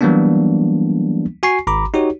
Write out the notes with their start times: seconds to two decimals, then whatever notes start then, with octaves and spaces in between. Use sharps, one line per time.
0.01 E3 F#3 G3 A#3 B3 D4
1.43 F#4 G#5 C#6 C7
1.67 G#1 A#5 B5 D6
1.94 D#4 F#4 G4 C#5